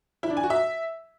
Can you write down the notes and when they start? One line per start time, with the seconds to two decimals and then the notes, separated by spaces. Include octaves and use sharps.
0.23 E4
0.30 D4
0.37 G#5
0.43 F#4
0.50 E5